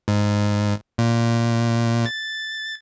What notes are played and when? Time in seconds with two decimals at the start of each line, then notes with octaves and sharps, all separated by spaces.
0.08 G#2
0.98 A#2
2.06 A6